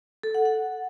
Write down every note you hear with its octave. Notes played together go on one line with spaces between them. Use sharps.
A4
F#5
F#5